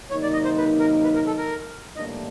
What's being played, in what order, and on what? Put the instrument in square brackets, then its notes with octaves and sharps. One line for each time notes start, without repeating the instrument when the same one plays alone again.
[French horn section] C3 D#3 F#3 A#3 D#4 [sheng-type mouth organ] C#5
[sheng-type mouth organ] D5
D#5
C5
B4
A#4
B4
A#4
A4
A#4
[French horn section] A2 E3 G3 A#3 D4 [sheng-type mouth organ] D#5